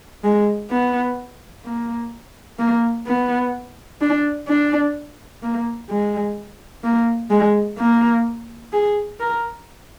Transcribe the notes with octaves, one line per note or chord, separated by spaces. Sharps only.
G#3
B3
A#3
A#3
B3
D4
D4
A#3
G#3
A#3
G#3
A#3
G#4
A#4